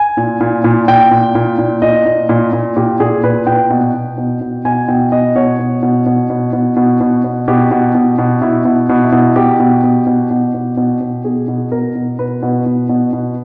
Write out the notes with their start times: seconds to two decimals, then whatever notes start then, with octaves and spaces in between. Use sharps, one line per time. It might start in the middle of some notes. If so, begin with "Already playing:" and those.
Already playing: G#5
0.17 A#2
0.41 A#2
0.64 A#2
0.88 A#2 G5
1.11 A#2
1.35 A#2
1.58 A#2
1.82 A#2 D#5
2.06 A#2
2.29 A#2
2.53 A#2
2.76 A#2 G4
3.00 A#2 G#4
3.23 A#2 B4
3.47 A#2 G5
3.70 B2
3.94 B2
4.18 B2
4.41 B2
4.65 B2 G#5
4.88 B2 G5
5.12 B2 D#5
5.35 B2 C#5
5.59 B2
5.83 B2
6.06 B2
6.30 B2
6.53 B2
6.76 B2
7.00 B2
7.24 B2
7.48 B2 G4
7.71 B2
7.95 B2
8.18 B2
8.42 B2 E4
8.65 B2
8.89 B2
9.04 E4
9.12 B2
9.36 B2 G4
9.60 B2
9.83 B2
10.07 B2
10.30 B2
10.54 B2
10.77 B2
11.01 B2
11.24 B2 G#4
11.48 B2
11.72 B2 A#4
11.95 B2
12.19 B2 B4
12.42 B2
12.66 B2
12.89 B2
13.13 B2